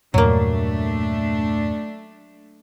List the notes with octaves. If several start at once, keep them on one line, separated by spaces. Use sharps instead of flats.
E2 G2 A#2 F#3 A3 A#3 D4